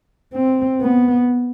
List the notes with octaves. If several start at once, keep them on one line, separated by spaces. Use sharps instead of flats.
C4
B3